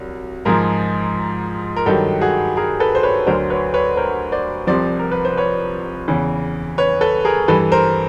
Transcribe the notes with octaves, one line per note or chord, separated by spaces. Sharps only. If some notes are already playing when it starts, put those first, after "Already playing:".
Already playing: C2 F#3
G#2 F3 G#4 A#4
A#4
G2 D#3 F#3 G4 A4
F#4 G#4
G#4 A#4
A4 B4
C5
B4 C#5
D2 D3 F#3 A#4 C5
B4 C#5
B4 C#5
A#4 C5
C5 D5
C2 C3 F3 C5 D5
A#4
B4
C5
B4 C#5
E2 C#3 E3
B4 C#5
A4 B4
G#4 A#4
G2 E3 A4 B4
A#4 C5